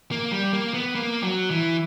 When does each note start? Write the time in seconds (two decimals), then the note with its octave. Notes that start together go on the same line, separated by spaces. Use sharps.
0.11 A#3
0.32 G3
0.53 A#3
0.74 B3
0.95 A#3
1.23 F#3
1.51 E3